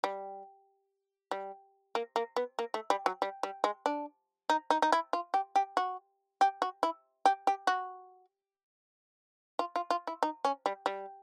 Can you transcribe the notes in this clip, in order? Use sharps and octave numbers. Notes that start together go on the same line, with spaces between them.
G3
G3
A#3
A#3
B3
A#3
A3
G3
F#3
G3
G3
G#3
D4
D#4
D#4
D#4
E4
F4
G4
G4
F#4
G4
F#4
E4
G4
G4
F#4
F4
F4
F4
E4
D#4
C#4
G3
G3